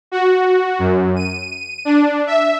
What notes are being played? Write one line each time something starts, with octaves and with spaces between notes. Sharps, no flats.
F#4
F#2
D#7
D4
E5